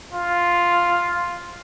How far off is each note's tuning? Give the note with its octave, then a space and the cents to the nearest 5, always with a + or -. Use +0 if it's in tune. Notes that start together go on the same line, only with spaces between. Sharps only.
F4 +0